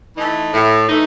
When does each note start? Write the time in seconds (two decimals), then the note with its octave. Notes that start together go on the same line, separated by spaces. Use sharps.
0.16 E3 A3 D#4
0.53 A2
0.87 E3 A3 D#4